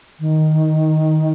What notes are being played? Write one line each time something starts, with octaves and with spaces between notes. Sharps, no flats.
D#3